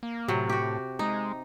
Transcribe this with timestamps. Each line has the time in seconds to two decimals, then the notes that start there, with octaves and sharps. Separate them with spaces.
0.03 A#3
0.28 A2 C3 F#3
0.49 F#4 G4
0.99 G#3 D#4